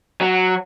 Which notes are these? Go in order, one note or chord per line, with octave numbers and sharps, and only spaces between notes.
F#3